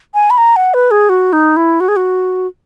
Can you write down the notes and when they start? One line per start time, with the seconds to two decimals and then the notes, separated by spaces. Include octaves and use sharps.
0.14 G#5
0.30 B5
0.38 A#5
0.56 F#5
0.74 B4
0.91 G#4
1.09 F#4
1.33 D#4
1.57 E4
1.80 F#4
1.88 G#4
1.96 F#4